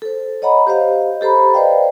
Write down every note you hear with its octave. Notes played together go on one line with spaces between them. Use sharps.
A4 C5
C#5 D#5 F#5 A#5 B5
G4 C5 D#5 F5
G4 A4 C5 A#5 B5
B4 C5 D5 D#5 F5 G5